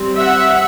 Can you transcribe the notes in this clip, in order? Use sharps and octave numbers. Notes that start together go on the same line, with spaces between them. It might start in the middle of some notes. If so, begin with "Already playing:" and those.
Already playing: G3 C4
E5 F#5